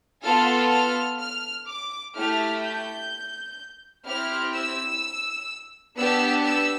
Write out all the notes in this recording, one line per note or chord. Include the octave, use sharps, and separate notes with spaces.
B3 F4 A4 F6
F6
F6
D6
A3 E4 G4 F6
G6
C4 E4 G4 F6
E6
B3 D4 G4 E6
E6